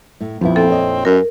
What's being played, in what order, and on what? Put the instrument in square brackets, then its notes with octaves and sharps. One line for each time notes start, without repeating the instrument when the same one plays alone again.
[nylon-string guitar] A2
[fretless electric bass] A#1 F2 [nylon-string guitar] F3 B3 E4
[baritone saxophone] C4 [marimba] A4
[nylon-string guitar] C#5 D#5
[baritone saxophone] F#2 [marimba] A#4